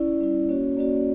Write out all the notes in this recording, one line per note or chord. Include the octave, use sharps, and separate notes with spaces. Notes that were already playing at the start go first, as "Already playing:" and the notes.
Already playing: C#4 E4 D5
G3 C#4 E4
A#3 C#4 F#4 C#5
A#3 C#4 F#4 D5